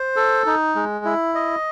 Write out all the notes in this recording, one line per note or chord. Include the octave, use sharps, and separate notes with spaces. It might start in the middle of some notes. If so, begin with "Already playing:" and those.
Already playing: C5
A4
D#4
G#3
E4
D#5